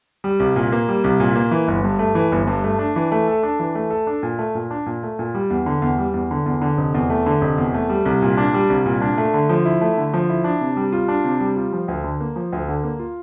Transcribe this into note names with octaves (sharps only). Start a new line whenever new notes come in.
G3
C2
A#2
A#3
G3
C2
A#2
A#3
E3
G1
G2
A3
E3
G1
G2
A3
D4
E3
A3
A4
D4
E3
A3
A4
D4
A#2
A3
A#2
D4
A#2
A3
A#2
G3
E2
D3
E2
G3
E2
D3
E2
D3
F1
E2
A3
D3
F1
E2
A3
G3
C2
A#2
D4
G3
C2
A#2
D4
A3
D3
F3
E4
A3
D3
F3
E4
D4
C3
G3
F4
D4
C3
G3
F4
F3
D2
D3
A#3
F3
D2
D3
A#3
F4